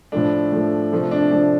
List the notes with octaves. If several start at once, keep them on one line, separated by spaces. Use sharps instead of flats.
A2 F3 A3 D4
A2 F3 A3
C3 F3 A3
D4
C3 F3 A3 D4